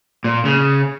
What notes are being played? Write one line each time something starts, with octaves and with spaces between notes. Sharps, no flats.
A#2
C#3